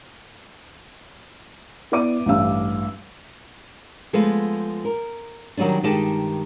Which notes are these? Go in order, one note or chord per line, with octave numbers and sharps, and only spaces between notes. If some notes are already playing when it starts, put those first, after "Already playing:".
B3 E4 D5 D6 D#7
A1 G2 F5 E6
F3 G#3 A3 B3 B4
A#4
D#3 F#3 G3 C#4 D4
G2 D#3 G#3 D#4 G4 A5